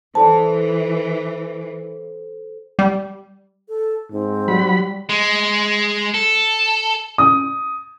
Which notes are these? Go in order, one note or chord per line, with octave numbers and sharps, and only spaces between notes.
E3 A4 C5 D5 A5
G3
A4
G#2 C4
F#3 G3 B5
G#3
A4
D#6